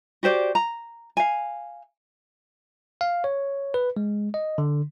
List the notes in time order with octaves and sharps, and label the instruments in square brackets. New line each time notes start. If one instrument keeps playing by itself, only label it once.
[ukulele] F#4 G4 C5 D5
A#5
F5 G#5
[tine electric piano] F5
C#5
B4
G#3
D#5
D3